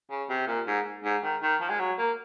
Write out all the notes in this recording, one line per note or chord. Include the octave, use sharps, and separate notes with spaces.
C#3
C3
A#2
G#2
G#2
D#3
D#3
F3
G#3
F#3
A#3